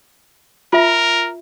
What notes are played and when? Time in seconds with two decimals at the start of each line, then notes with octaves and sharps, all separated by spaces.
0.73 F4 A#4 E5